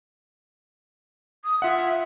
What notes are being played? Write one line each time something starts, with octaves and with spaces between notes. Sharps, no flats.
D#6
F4 E5 F#5